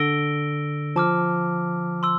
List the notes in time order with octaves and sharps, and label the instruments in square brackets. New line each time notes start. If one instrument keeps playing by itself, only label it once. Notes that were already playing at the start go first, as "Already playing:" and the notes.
Already playing: [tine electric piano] D3 [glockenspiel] E6 A#6 D7 G7
[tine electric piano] F3 [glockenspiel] A5 D6 F6
[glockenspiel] C6 E6